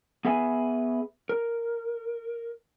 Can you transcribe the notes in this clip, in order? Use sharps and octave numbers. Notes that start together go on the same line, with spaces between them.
B3 G#4 B4 E5 G#5
A#4